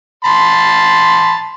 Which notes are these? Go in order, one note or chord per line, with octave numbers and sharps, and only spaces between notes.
A5 B5 C6